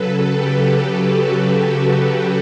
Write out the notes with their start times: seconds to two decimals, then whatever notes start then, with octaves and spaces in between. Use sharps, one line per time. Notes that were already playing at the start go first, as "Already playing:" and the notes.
Already playing: C#3 F#3 A4 B4
0.31 G4
1.11 F#4
1.52 F#4
1.92 F#4